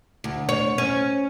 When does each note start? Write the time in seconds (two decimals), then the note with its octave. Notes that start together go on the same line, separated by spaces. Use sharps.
0.24 D2
0.49 C#5
0.78 C#4